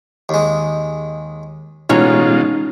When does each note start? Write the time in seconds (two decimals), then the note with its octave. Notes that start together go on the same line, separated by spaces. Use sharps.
0.29 D#2 G#3
1.90 A1 B2 G#3 C#4 D#4 F4 F#4